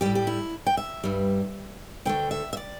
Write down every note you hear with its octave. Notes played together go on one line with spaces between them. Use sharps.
A2 G3 G4
G4
E4
G5
E5
G2 G3
D2 D3 A3 G5
E5
E5
D5